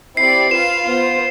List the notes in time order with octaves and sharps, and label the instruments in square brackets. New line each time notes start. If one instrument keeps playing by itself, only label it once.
[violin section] C4 E4 G4 D5 [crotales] C7
[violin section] F4 B4 F5 [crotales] E7
[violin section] B3 F4 C5